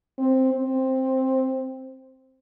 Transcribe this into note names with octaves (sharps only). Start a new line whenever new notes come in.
C4
C4